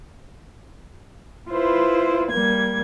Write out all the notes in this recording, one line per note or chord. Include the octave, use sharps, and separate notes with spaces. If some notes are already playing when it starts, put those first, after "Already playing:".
E4 F4 B4 C5
G3 A#3 G#6